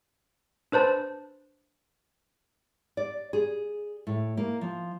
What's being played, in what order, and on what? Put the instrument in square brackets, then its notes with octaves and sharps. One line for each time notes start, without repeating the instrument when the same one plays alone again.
[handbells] D4 B4 C5 A5
[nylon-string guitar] D5
G#4
A2
A#3
F3